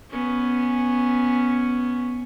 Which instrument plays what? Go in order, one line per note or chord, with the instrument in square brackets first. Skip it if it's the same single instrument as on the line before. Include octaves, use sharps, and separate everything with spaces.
[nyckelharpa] B3 C#4